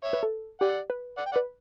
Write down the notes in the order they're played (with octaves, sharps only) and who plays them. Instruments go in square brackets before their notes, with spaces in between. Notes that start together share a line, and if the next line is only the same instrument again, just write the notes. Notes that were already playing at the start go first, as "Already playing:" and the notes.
[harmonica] C#5 E5
[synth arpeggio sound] B4
A4
[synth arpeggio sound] G4 [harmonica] D5 F#5
[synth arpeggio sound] B4
[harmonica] D5 F#5
G5
D5 F#5
[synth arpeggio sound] B4